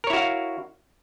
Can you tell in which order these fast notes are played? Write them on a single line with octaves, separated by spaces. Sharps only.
A#4 C#5 E4 F#4 F5